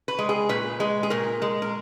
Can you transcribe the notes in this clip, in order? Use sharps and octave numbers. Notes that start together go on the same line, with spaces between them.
B4
G#3
G#4
A#2 B4
G#3
G#4
A#2 A#4
G#3
A#4